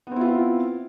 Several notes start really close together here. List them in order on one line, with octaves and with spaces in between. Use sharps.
B3 C4 E4 F4